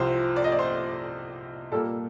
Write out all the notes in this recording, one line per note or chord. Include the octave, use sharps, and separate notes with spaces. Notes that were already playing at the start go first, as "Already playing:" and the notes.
Already playing: C2 C3 F3 C5
D5
D#5
D5
C5
A#2 G3 A#3 A4